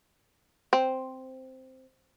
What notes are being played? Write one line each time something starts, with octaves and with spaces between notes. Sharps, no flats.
C4